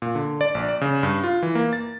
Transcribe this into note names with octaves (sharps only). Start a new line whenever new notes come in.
A#2
D3
D5
A#1
D5
C#3
G2
F4
E3
A#3
A6